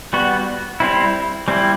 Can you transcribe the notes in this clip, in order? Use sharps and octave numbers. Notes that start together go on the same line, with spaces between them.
G3 B3 F#4
G3 C4 E4
G3 C4 E4